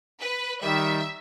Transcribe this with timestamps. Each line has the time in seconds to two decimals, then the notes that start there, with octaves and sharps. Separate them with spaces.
0.20 B4
0.63 D#3 G3 E5